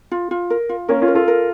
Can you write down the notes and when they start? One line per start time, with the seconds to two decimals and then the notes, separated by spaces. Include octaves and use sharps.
0.11 F4
0.31 F4
0.50 A#4
0.69 F4
0.88 A#3 C#4 A#4
1.02 C#4 F4
1.08 A#4
1.15 F4 A4
1.28 A#4